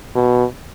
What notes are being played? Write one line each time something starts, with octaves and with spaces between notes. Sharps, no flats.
B2